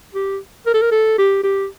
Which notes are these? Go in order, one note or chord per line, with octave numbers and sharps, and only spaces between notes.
G4
A#4
A4
A#4
A4
G4
G4